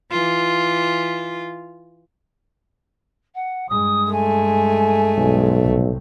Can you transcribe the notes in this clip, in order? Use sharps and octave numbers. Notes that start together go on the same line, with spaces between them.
E3 F4
F#5
G2 G#3 D#6
A3 G#5
B1
C2 A2